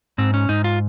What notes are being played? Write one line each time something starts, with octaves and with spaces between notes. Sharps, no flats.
G#2 C4
C#4
G#2 D#4
F4